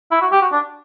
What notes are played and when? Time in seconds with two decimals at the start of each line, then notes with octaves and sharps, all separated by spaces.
0.11 E4
0.21 F#4
0.32 G4
0.42 F#4
0.52 D4